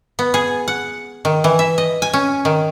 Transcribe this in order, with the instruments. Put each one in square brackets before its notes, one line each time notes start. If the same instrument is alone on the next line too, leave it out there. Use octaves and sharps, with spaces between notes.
[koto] B3
G#4
F#5
D#3
E3
E5
D#5
G#5
C#4
D#3